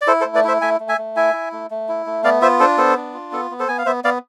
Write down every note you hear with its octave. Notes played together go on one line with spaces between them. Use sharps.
D5
E4 A4 C5
A4 C5
A3
B4 D5
E4 C5 E5
A3 E5 G#5
A3
E5 G#5
A3
E4 E5 G#5
E4
A3
A3
E4
A3
B3 D5 F5
F4 C5 E5
D4 A4 C5
B3 A4 C5
D4
F4
B3 A4
B3
A4 C5
B3 G#5
F5
B3 C5 E5
B3 D5 F5